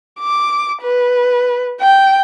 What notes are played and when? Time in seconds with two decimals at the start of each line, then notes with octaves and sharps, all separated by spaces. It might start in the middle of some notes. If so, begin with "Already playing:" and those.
0.20 D6
0.82 B4
1.81 G5